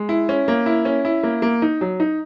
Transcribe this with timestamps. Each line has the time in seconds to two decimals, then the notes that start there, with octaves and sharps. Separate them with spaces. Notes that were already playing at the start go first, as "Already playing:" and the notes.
Already playing: G#3
0.09 E4
0.29 C#4
0.48 A#3
0.66 E4
0.85 C#4
1.05 E4
1.23 A#3
1.42 A#3
1.62 D#4
1.81 F#3
2.00 D#4